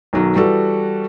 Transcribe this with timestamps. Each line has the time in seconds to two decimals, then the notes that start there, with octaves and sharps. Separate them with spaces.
0.13 B1 D#3 F#3
0.35 E3 G3 F#4 A4